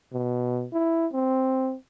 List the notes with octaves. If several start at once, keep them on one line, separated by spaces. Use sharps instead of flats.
B2
E4
C4